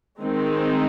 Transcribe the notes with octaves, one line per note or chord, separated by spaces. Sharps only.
D#3 G#3 C4 D#4